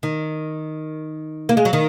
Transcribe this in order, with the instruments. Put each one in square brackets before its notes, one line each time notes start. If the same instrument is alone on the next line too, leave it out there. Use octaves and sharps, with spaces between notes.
[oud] D#3
A#3
G#3
F#3
D#3